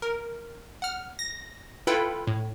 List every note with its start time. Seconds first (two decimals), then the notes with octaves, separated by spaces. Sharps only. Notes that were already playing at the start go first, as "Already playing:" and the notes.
0.02 A#4
0.82 F#5 F6
1.19 A#6
1.87 E4 F4 A4 B4 G5 B5
2.27 A2